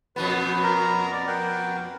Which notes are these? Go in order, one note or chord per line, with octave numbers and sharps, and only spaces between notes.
F2 B2 B3 B4
A#4 A#5
D5
A#4 F#5 G5